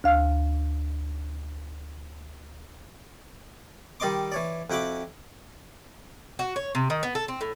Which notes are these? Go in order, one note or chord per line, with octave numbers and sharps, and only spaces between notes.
D2 F5 F6
D#3 G3 D5 D#5 C6 D6
E3 C#5 D5
F2 E4 F#4 G5 B5 D6
F#4
C#5
C3
D#3
B3
A4
C4
A2